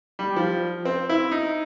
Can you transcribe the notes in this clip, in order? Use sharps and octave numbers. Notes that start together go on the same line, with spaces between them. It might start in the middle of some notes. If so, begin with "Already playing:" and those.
G3
F3
C4
E4
D#4